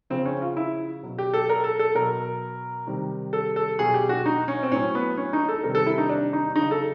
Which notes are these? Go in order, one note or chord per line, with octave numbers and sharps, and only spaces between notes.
C#3 F3 C4
C#4
F4
E4
B2 F#3
G4
A4
A#4
A4
A4
B2 F#3 A#4
C3 D#3 G3
A4
A4
B2 F#3 G#4
G4
F#4
D#4
C#4
C4
A2 F#3 C#4
B3
C#4
D#4
A4
C3 D#3 G3 A#4
A4
E4
D#4
D4
D#4
C#3 F#3 D#4
A4